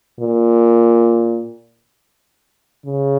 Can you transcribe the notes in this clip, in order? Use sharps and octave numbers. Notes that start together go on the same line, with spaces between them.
A#2
C#3